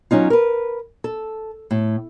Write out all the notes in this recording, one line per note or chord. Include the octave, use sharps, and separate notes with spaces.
F#3 C#4 D#4 F4
A#4 B4
A4
A2